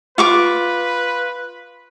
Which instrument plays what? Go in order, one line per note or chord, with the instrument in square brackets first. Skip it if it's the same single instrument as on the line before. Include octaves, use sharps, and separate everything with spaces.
[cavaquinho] F4 C#6 D6 [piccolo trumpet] B4